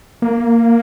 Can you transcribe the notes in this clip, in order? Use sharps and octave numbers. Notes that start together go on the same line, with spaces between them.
A#3